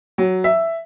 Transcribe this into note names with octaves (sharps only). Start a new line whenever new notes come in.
F#3
E5